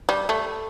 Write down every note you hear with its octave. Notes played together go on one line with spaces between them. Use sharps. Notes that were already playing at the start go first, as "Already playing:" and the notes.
G3
A3